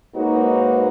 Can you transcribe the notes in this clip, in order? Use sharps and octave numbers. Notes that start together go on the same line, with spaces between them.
G#2 A#3 D#4 F#4 B4 C#5